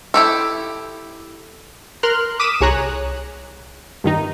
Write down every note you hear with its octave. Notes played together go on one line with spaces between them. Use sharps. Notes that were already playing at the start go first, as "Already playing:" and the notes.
E4 G4 A4
A#4 C6 F6 F#6
D6 D#6 B6 D#7 E7
C2 G#4 C#5 A#5 F#6
G2 D#3 D#4